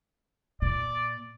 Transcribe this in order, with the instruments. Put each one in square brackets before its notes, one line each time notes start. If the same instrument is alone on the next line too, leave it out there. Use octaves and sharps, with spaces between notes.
[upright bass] A#2 [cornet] D5